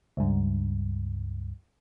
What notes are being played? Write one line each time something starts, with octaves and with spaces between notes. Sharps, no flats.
C#2 G2